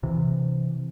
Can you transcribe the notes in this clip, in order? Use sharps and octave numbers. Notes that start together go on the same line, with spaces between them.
C3 E3